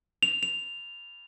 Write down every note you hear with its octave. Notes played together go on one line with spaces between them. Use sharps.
F7
F7